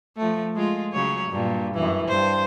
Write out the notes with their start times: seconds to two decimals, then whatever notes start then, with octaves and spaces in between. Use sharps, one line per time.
0.17 F3 A3
0.56 G#3 F4
0.93 C#3 F#3 C#5
1.31 G2 A#2
1.75 F#2 E3
2.08 G2 C5